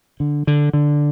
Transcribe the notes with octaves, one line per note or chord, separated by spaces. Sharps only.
D3
D3
D3